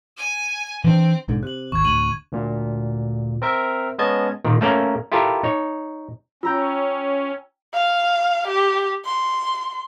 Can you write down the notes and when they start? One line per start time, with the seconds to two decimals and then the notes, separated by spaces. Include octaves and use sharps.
0.17 G#5
0.84 E3 C4 D4
1.28 B1 G#2 D3
1.43 C3 F#6 F#7
1.72 G#1 D#2 C#6 G#6
1.85 D1 D2 D#7 F#7
2.32 D2 A#2
3.42 C4 A#4 E5
3.98 G#3 B3 C#4 D#5 A5 G#6
4.44 A#2 D#3
4.61 A3 A#3 C#4 A#4
5.12 E4 F4 G4 A4 A#4
5.43 D#4 C#5
6.43 C#4 F4 G5 A#5 E6
7.74 F5
8.48 G4
9.05 C6